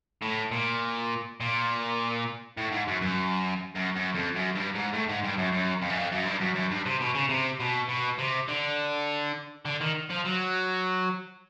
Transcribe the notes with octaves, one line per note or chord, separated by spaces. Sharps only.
A2
A#2
A#2
A2
G#2
F#2
F#2
F#2
F#2
F2
F#2
G2
G#2
A2
G#2
G2
F#2
F#2
F2
F#2
F2
F#2
G2
F#2
F#2
G2
C3
B2
C#3
C3
B2
B2
C3
D3
D3
D#3
F3
F#3